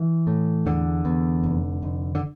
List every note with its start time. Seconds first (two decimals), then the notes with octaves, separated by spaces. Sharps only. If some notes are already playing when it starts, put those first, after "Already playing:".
Already playing: E3
0.27 A2
0.66 E2 D3
1.05 E2
1.43 F1
1.82 F1
2.15 D3